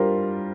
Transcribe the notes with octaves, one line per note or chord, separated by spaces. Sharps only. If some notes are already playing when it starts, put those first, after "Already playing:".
Already playing: G3 D4 F4 G4 A#4 C5